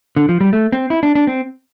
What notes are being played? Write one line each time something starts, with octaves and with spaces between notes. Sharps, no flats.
D3
F3
G3
A3
C4
E4
D4
D4
C4